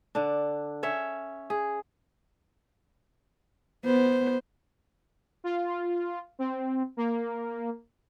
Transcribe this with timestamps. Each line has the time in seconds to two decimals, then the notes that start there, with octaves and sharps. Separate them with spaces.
0.15 D3 D4
0.83 C#4 C#5 E5
1.50 G#4
3.85 B3 C5
5.44 F4
6.39 C4
6.97 A#3